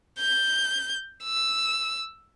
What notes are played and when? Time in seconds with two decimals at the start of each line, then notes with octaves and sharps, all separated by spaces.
0.20 G6
1.24 E6